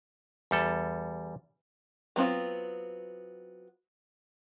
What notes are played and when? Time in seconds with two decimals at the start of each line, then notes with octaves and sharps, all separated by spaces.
0.51 E2 G3 A4
2.16 F#3 B3 C4 F4